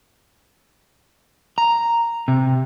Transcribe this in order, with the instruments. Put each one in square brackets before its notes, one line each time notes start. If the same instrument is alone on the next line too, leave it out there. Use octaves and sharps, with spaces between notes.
[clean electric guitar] A#5
C3